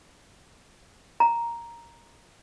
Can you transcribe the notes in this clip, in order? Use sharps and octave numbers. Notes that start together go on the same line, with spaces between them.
A#5